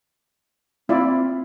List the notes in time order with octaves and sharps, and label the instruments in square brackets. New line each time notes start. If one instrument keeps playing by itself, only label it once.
[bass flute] C4 [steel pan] E4 F4 D5